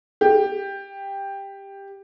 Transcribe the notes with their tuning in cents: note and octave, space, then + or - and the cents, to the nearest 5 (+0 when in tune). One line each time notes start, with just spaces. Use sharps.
G4 +10